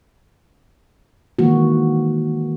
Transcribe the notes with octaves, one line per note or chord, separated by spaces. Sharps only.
D#3 E3 G#3 A#3 F#4